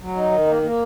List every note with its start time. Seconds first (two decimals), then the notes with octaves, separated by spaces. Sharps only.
0.01 F#3
0.16 D#4
0.32 D#3
0.47 A#3
0.63 A#3